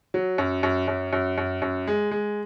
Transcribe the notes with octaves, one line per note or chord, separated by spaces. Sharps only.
F#3
F#2
F#2
F#2
F#2
F#2
F#2
G#3
G#3